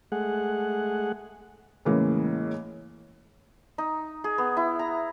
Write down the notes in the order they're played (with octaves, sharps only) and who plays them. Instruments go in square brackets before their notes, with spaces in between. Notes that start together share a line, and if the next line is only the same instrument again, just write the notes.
[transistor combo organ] G#3 A3 G#4 F#5
[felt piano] A2 C#3 E3 G#3 A#3
[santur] D#4
G#4
B3
E4
A#5